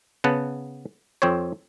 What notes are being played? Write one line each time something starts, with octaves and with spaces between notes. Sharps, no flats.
C#3 B3 F#5 A5
F2 C4 C5 C#5